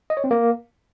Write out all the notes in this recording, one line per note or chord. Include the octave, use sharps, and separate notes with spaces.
D#5
C#5
C4
A#3